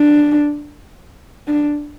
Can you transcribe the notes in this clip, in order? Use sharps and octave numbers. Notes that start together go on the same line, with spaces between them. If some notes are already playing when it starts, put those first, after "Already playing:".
Already playing: D4
D4